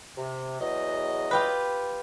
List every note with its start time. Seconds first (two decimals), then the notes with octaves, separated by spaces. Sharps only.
0.17 C3
0.60 E2 F#3 D#5
1.31 F4 G4 B4